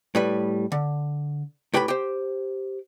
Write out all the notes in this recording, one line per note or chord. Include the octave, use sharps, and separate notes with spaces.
A2 G3 B4
D3
A2 G4 B4 G5 G#5 B5
G4 C5